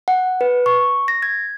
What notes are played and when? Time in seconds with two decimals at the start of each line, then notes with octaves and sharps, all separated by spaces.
0.08 F#5
0.41 B4
0.66 C#6
1.08 A#6
1.22 G#6